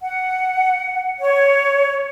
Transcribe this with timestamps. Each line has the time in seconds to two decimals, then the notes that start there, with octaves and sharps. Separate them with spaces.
0.02 F#5
1.20 C#5